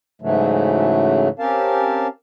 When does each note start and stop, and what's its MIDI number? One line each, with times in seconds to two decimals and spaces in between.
0.22 1.28 44
0.22 1.28 49
0.22 1.28 52
0.22 1.28 54
0.22 1.28 57
1.39 2.07 60
1.39 2.07 61
1.39 2.07 67
1.39 2.07 70
1.39 2.07 77
1.39 2.07 81